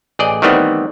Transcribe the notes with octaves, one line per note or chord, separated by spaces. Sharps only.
A1 G#4 D5 D#5
D#3 E3 G3 A3 B3 C4